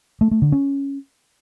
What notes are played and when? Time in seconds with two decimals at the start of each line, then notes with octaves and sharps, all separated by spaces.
0.21 A3
0.31 A3
0.42 D3
0.52 C#4